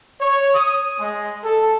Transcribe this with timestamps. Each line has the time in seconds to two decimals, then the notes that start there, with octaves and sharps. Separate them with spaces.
0.21 C#5
0.54 D#6
1.00 G#3
1.44 A4